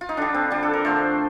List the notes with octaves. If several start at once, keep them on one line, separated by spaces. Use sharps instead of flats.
F4
D#4
D3 G3 D4
C4
D3 G3 D4
A4
A#4
D3 F3 A3 C5